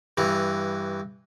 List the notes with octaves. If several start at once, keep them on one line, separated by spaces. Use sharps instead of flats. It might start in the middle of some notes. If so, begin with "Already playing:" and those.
G2 E3